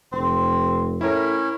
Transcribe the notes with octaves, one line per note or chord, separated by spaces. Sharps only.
F1 C4
A2 C#4 E4 A#4